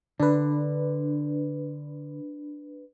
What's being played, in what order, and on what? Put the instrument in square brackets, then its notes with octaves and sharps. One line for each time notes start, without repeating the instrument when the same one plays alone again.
[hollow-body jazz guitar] D3 [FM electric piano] D4 B4